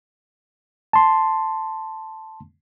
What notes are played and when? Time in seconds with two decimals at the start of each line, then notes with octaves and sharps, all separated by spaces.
0.93 A5 C6